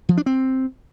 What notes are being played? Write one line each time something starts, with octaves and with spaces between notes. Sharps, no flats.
F3
D4
C4